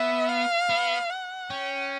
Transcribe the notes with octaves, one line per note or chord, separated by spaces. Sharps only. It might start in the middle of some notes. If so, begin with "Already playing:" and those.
Already playing: B3 E5
F5
B3
F#5
C#4 G5